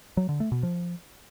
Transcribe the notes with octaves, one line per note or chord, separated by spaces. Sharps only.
F#3
D3
A3
B2
F3